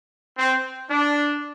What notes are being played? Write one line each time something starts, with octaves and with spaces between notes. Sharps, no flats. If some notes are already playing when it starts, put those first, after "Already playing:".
C4
D4